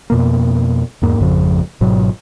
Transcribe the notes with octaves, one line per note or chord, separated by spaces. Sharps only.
F2 B2 A#3
E2 G#2 A#3
G#1 F2 C#3 F3
G#1 G#2 B2 F#3